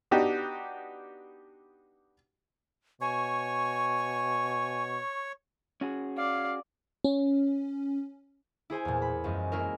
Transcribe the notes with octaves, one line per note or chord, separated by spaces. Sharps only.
B3 D4 D#4 F#4 G4
B2 C#5 G#5 C#6
C#4 F#4 G#4
D5 F5
C#4
E4 G#4 C5 G#5
E2 A#2
B5
F#2 F3 G#3
G#3 A#3 C#4 E4 A#4